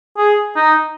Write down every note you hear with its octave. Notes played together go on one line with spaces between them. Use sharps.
G#4
D#4